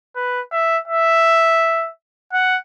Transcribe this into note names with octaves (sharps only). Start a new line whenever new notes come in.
B4
E5
E5
F#5